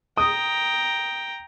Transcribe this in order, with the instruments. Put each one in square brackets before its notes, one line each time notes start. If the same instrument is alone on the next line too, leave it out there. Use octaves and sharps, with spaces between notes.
[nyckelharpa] G5 A#5 [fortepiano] D#6